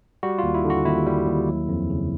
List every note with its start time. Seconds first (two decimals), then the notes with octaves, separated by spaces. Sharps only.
0.23 G3 F#4
0.38 D#2 F4
0.54 E4
0.64 D3
0.70 F#4
0.85 D#2 E4
1.06 G3
1.27 D#2
1.49 F#3
1.69 F2
1.90 C#3